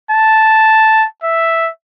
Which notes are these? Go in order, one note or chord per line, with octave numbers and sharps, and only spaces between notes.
A5
E5